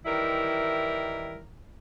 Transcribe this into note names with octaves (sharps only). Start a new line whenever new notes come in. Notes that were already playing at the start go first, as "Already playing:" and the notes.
D#3 E3 G3 E4 A#4